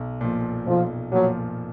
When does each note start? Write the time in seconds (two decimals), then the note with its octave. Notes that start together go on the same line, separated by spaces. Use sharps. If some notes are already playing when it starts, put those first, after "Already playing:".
Already playing: B1
0.21 A#2 F3
0.67 B1 F3
1.12 A#2 F3 F#3